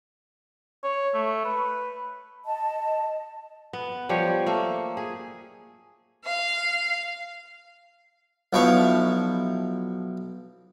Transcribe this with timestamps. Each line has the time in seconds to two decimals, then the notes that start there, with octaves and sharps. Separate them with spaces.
0.83 C#5
1.14 A3
1.45 B4
2.45 D#5 A5
3.73 B3
4.09 F3 G3 G4 C#5
4.46 A3 A#3
4.97 G#4
6.24 F5
8.53 B1 F3 E4 F5 C#6